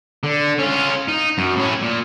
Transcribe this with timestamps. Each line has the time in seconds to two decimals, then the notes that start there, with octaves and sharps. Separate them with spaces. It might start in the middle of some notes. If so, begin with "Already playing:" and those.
0.24 D3
0.58 C#4 F4
1.08 D#4
1.38 F#2
1.56 A2 C#4
1.83 A#2